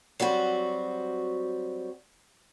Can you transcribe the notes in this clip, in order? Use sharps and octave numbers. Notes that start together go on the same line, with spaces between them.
F#3 G3 C4 F#4